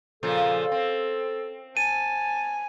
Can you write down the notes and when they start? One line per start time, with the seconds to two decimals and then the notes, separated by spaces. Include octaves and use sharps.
0.23 A#2 C#3 F3 A4
0.72 C4
1.77 G#5 A5 D#7